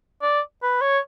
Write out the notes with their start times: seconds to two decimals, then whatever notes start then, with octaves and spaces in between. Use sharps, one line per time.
0.22 D5
0.63 B4
0.81 C#5